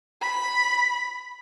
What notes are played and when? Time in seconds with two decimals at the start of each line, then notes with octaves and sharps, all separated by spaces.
0.22 B5